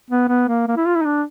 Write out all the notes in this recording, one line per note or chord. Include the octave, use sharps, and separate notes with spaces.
B3
B3
A#3
A#3
E4
F4
E4
D#4
D4